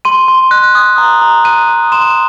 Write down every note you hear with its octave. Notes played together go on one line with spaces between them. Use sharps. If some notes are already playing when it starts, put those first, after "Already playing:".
C6 D#7
C6
F#6
D#6
A#5
A#5
F#6 D#7
D#6
C6 E7